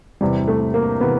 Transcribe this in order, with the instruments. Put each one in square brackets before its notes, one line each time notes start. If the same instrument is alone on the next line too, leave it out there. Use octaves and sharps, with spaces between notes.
[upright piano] E2 C3 E3 G3
A3
A#3
C3 E3 B3